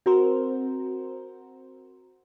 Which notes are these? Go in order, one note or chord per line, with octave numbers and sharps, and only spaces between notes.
C4 F#4 A#4 C5